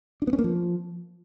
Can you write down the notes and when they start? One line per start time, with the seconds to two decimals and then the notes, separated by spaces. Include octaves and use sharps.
0.22 D4
0.27 B3
0.33 C#4
0.39 A#3
0.44 F3